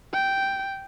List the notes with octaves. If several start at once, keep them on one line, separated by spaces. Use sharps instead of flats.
G5